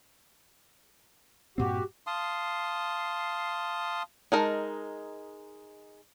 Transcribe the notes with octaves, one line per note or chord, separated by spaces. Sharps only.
G2 A#2 C4 F#4 G4
F5 A5 C6 D#6
G#3 D#4 A#4 A5